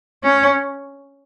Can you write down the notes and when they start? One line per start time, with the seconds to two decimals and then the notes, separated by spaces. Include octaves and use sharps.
0.23 C#4